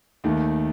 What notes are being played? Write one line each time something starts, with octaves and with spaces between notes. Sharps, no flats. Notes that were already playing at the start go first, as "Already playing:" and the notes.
D#2 D#3 A3